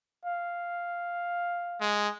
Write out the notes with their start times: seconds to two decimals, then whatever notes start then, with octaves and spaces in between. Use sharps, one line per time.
0.25 F5
1.81 G#3